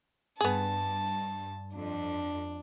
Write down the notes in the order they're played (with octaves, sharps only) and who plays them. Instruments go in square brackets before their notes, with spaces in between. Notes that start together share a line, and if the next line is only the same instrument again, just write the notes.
[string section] G2 [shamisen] B3 G#4 [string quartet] A5
[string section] F2 [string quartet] D4